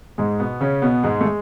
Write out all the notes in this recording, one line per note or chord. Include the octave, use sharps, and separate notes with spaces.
G#2 G#3
B2 B3
C#3 C#4
B2 B3
G#2 G#3
A3
G#3